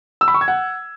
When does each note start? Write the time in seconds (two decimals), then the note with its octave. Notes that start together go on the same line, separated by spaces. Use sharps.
0.21 E6
0.28 B5
0.34 C#6
0.41 G#6
0.48 F#5